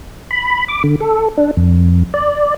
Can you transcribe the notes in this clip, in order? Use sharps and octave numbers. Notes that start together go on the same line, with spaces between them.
B5
D6
D3
A4
D4
F2
D5